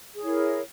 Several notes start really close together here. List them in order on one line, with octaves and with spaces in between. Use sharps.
G#4 C#5 E4 A#4